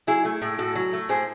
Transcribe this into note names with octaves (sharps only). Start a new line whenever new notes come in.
F#3 E4 G#4
A3
A2
A2 F#4 A4
F#3
A3
A2 G#4 C5